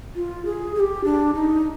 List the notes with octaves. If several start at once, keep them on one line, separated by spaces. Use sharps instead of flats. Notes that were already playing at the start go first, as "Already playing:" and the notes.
F4
G#4
G#4
G4
D4
D#4